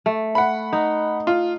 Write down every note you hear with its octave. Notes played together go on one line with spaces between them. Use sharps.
A3
F#5 B5
D#4
F4